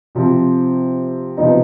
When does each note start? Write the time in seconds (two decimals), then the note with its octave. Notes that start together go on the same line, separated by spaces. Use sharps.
0.15 C3 F3 C4
1.37 C3 F3 B3 D#4